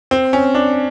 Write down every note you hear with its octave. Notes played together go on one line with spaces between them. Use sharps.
C4
C#4
D4